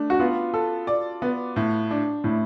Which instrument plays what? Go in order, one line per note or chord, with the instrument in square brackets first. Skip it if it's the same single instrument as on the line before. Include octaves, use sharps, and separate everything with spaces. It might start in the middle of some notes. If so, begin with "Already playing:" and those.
Already playing: [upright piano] A3 D4
[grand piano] F#4
[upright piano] B3 [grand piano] F4
[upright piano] A4
D5
B3
A2
D4
[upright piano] A2 [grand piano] E4